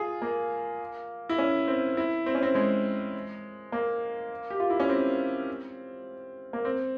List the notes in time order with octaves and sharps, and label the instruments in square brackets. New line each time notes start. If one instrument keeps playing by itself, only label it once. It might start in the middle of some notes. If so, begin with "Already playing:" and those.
Already playing: [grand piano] F4 G#4
A#3
E4
C#4
C4
E4
C4
C#4
C4
G#3
A#3
G4
F4
E4
C#4
C4
A#3
C4